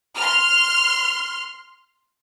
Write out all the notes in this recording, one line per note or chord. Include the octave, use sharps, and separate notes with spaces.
C6 F6